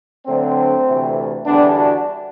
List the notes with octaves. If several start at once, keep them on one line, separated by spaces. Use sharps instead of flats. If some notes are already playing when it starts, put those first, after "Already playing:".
D2 D3 F#3 A3 C4
D2 C3 E3 A3
E2 D3 G3 B3 D4
D4 F#4